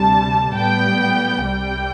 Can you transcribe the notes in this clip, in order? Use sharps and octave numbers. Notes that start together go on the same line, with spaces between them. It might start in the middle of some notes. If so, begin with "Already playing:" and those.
Already playing: D2 C3 G3 A5
A2 G3 B3 G5
C2 C3 G3 G5